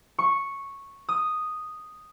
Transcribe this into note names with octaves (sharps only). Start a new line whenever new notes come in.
C#6
D#6